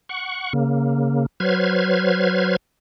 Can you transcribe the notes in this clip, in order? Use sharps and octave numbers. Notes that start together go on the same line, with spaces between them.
F#5 C#6
C#3 A#3
F#3 B4 C5 F6 G#6